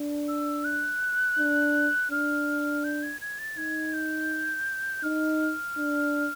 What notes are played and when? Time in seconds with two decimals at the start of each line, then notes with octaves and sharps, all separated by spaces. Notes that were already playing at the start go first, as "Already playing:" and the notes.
Already playing: D4
0.28 E6
0.64 F#6
1.38 D4
2.11 D4 F6
2.84 G6
3.03 G#6
3.21 G#6
3.39 A6
3.57 D#4 G#6
3.93 G6
5.03 D#4 F6
5.77 D4